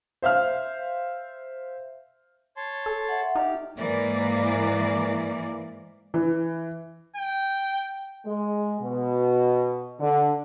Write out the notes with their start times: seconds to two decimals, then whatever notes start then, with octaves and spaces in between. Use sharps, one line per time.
0.22 C5 E5 F5 F6
2.57 C#5 A5 C6
2.86 A4
3.09 E5 F#5
3.35 D#4 G4 F6
3.78 G#2 E3 A#3 D5
6.14 E3
7.16 G5
8.26 G#3
8.81 B2
10.00 D3